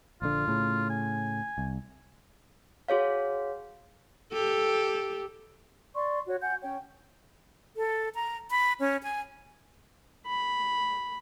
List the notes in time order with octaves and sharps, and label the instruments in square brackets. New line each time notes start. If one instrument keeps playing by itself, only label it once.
[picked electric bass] A#1 D3 [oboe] F4
[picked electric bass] A2 C#3
[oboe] G#5
[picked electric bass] C2
[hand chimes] F#4 G#4 C#5 F5
[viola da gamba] G4 A4
[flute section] D5 C6 C#6
F#4 C#5
F#5 G#5 G6
C#4 C#5 G5
[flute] A4
A#5
B5
C#4
G#5
[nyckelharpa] B5